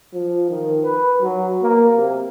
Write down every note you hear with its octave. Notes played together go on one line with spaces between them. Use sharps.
F3
D#3
B4
F#3
A#3
C3